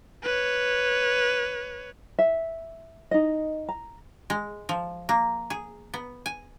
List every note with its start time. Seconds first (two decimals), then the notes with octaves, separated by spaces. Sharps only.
0.23 B4 C#5
2.19 E5
3.11 D#4 D#5
3.69 A#5
4.30 G#3
4.69 F3
5.09 A#3
5.50 G#4
5.94 B3
6.26 G#5